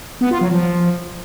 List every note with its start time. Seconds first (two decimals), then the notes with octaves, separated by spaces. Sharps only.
0.21 B3
0.31 F4
0.41 F#3
0.51 F3